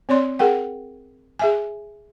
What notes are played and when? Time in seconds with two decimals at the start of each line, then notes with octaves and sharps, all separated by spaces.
0.09 C4 C#5 D5 C6
0.39 G#4 A#4 F#5 G5
1.39 G#4 E5 G#5